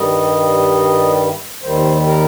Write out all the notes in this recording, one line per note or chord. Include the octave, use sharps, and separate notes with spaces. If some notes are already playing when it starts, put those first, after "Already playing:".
Already playing: G2 D#3 G3 D#5
D#2 D#3 G3 C5
A#4